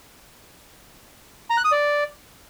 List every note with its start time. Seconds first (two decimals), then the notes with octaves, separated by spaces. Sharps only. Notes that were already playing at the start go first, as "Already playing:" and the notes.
1.50 A#5
1.57 F#6
1.64 D#6
1.72 D5